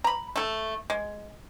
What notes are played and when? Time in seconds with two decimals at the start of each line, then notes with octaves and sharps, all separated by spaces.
0.04 A#5 B5
0.36 A3 A4
0.90 G#3